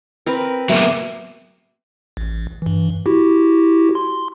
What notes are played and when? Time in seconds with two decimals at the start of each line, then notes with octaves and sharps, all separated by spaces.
0.26 C4 A#4 B4
0.69 F#3 A#3 B3 E5 D6
2.17 A1
2.62 G2 E3
3.06 E4 F#4 G4
3.95 C6